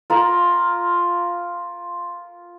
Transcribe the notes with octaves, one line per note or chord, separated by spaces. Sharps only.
F4 A#4